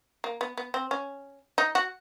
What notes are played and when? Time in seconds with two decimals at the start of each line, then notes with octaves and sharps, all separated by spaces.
0.24 A#3
0.41 B3
0.58 B3
0.74 C4
0.91 C#4
1.58 D#4
1.75 F#4